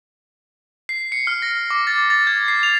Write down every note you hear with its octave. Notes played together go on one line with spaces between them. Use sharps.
C7
C#7
F6
A#6
D6
A6
A6
G#6
C7
F7